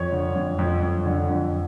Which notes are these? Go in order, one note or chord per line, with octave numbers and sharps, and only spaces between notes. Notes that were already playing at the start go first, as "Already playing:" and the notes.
Already playing: F2 C#5
D3
F2
F2
F2
D3
F2